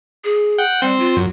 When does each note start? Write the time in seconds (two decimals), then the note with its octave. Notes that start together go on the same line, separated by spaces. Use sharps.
0.24 G#4
0.58 F#5 G5
0.82 G3 C4
0.99 F4
1.16 F#2